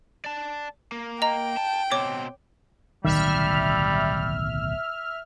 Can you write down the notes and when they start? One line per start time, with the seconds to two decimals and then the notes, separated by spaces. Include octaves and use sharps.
0.25 D5 A5
0.92 A#3
1.22 D#5 G5 A#5
1.57 A5
1.92 B2 C4 C#5 D6
3.05 D1 B1 C3 D#3 G3 E5 F6